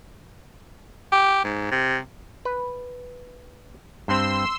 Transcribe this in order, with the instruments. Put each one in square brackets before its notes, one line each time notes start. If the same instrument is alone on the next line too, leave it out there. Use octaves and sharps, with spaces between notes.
[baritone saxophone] G4
G#2
C3
[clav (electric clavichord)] B4
[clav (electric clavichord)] G2 C4 [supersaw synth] C6 E6